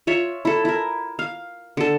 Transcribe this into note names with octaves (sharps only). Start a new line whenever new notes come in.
F4 C#5 E5
E4 A4
E4 A#4
F5
D3 A4